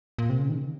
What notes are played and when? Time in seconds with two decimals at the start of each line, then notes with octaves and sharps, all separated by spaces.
0.18 A#2
0.30 C3
0.39 C#3
0.49 D#3